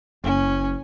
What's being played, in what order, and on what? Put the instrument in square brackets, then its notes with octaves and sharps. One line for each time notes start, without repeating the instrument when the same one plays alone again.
[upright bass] F#1 [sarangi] C#4